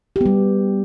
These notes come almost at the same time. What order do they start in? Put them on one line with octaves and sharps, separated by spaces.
G4 B3 G3